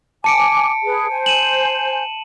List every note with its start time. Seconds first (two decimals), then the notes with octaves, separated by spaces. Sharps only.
0.24 G#5 A5 D6 C#7 D7
0.84 G#4 B4
1.10 C5 G#5
1.26 D#7 E7 F#7